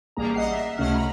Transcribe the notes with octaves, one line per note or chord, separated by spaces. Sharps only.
A1 G3 A#3 G#4 A#5
D#5 F#5 C7
E5
C#2 C3 A3 C#4 F#5 F6
A#5 B5